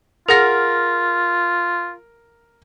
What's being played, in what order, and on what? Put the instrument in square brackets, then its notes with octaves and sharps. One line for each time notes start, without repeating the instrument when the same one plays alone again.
[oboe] F4 [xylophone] G#4 F#5 F6 [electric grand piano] A#4 A#6